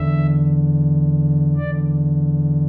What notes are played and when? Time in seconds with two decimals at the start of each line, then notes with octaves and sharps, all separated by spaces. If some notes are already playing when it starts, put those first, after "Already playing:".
Already playing: E2 D3 E5
1.56 E2 D3 D5